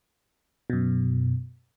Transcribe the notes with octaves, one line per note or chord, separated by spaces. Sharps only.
F#2 B2